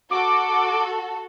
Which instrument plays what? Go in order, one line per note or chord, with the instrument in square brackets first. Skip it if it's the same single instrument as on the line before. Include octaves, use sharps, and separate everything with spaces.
[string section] F#4 A4 [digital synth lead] D6